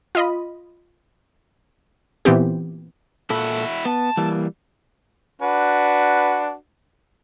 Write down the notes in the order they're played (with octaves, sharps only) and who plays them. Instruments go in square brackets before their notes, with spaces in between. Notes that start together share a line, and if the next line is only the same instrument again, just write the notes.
[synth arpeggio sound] F4 D#5 B5
A#2 E3 B3 C4 G4
[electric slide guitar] A#2 A4 [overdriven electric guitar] E4 F#4
[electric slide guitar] B3 [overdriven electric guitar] A5
[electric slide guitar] E3 G3 A#3
[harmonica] D4 F#4 B4